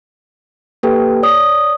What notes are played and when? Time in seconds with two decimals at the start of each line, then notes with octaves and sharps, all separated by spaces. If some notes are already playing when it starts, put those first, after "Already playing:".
0.83 A#3 G4 A4 B4 G5
1.23 C#5 D5 D#6